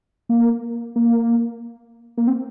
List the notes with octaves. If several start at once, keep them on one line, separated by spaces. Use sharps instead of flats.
A#3
A#3
A#3
C4